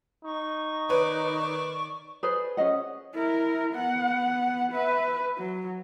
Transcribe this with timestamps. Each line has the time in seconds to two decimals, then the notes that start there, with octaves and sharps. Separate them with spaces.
0.24 D#4 C#6
0.90 D#3 B4 C#5 D5
2.23 G#4 B4 C5 D5
2.57 C#4 G#4 D#5 F#5
3.14 E4 A#4
3.74 B3 F#5
4.72 B4 E5
5.38 F#3